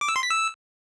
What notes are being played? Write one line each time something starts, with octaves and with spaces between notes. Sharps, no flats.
D6
E6
C6
B6
E6